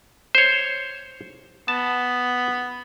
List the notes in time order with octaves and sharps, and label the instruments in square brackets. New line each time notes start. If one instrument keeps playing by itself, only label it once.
[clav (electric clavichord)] C5 C#5
[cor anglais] B3 [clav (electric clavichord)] A5